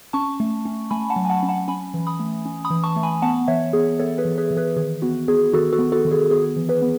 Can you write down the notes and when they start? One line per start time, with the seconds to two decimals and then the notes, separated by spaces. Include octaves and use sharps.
0.13 C#4 A5 C#6
0.40 A3
0.65 C#4
0.91 A3 G#5 B5
1.10 F#5 A5
1.16 F#3
1.25 G#5
1.30 F#5 A5
1.43 C#4
1.49 F#5 A5
1.68 C#4 G#5 B5
1.94 E3
2.07 B5 D#6
2.20 A3
2.46 C#4
2.65 B5 D#6
2.70 E3
2.84 A5 C#6
2.96 A3
3.03 G#5 B5
3.22 B3 F#5 A5
3.48 E3 C#5 E5
3.73 B3 G#4
3.99 B3 A4 C#5
4.18 G#4 B4
4.25 E3
4.38 G#4 B4
4.51 E3
4.57 G#4 B4
4.76 D#3 G#4
5.02 B3 F#4
5.28 B3 G#4
5.53 D#3 F#4 A4
5.73 F#4 A4
5.79 B3
5.92 F#4 A4
6.05 D#3
6.11 G#4
6.31 B3 G#4
6.56 E3
6.69 G#4 B4
6.82 B3